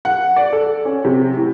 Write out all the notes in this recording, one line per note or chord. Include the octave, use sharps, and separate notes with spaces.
F#5
D5
A4
C#4
C3
A2